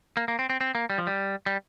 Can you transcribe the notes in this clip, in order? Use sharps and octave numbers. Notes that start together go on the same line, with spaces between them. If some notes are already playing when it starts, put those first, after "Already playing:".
A#3
A#3
C4
C4
C4
A#3
G3
F3
G3
G3